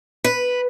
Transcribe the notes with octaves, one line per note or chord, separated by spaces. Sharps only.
B4